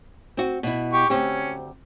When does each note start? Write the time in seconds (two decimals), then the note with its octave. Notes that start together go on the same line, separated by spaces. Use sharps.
0.37 C4 F#4
0.63 B2 E4
0.93 G4 C#6
1.10 D2 C4 C#4 G4